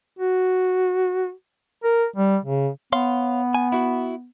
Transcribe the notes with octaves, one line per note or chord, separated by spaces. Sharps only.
F#4
A#4
G3
C#3
B3 C#5 F5 C6
G#5
E4 F#4